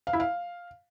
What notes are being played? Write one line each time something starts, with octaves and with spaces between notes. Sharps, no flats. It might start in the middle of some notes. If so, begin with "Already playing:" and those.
F5
E4
F5